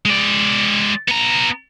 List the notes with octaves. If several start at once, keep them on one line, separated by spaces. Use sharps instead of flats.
G#3 D5
B3 A#5